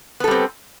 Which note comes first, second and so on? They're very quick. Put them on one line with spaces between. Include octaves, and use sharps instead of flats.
B3 A4 G3 C4